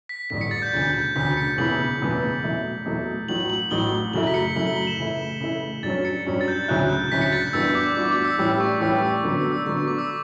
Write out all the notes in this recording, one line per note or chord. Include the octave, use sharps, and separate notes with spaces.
B6
A1 G2 D3 B6
C#7
A6
G6
E1 D2 C#3 A6
G6
E1 D2 C#3 B6
C#7
E1 E2 C#3 E3 B3 F#7
E1 E2 C#3 E3 B3
E2 B2 F#3 A3 E4
E2 B2 F#3 A3 E4
A1 A2 F#3 F#7
F#7
A1 A2 F#3 G7
F#2 C#3 F#3 A3 E4 F#7
B6
C#7
F#2 C#3 F#3 A3 E4 F#7
G7
F#7
E7
C#3 E3 A3 E4
C#3 E3 A3 E4
G2 F#3 C#4 A6
C#7
G2 F#3 C#4
A6
G6
D2 C#3 F#3 C#4 E4 F#6
G6
D2 C#3 F#3 C#4 E4 B6
C#7
A6
G6
G2 E3 B3 D4 F#4 E6
D6
G2 E3 B3 D4 F#4 D6
D6
E6
A2 E3 G3 C#4 G4 E6
C#6
A2 E3 G3 C#4 G4 E6
E6
D3 F#3 B3
E6
E6
D3 F#3 B3 C#6
C#6
D6
E6